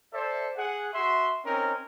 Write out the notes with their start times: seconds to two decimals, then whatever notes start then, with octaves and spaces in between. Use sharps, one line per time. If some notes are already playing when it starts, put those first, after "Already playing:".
0.12 A4 C5 D5 E5
0.56 G#4 F#5
0.92 F#4 E5 C6
1.43 C4 C#4 D#4 A#4